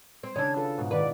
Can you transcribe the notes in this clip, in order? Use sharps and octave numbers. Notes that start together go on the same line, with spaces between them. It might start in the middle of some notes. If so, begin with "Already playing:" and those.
C4
C#3 C#4 D4 E6 G#6
F4 A4 B4
G#2 B2
A#2 D#3 B4 D5